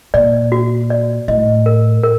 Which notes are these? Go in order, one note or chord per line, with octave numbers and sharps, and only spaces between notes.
A#2 D5
F#4
D5
A2 D#5
A#4
A#4